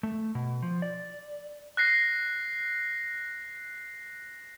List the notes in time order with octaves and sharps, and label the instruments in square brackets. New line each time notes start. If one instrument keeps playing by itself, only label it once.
[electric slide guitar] A3
B2
F3
D5
[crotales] F#6 A#6 C7